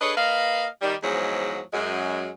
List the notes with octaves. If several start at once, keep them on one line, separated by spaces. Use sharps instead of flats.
D4 G#4 A4 B4 C#5 D#5
A#3 B4 D#5 F5
D#3 G3
E2 G#2 F3 F#3 G#3
F#2 G#3